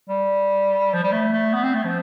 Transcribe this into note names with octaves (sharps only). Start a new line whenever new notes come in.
G3
F3
G3
A3
A3
B3
C4
A3
F3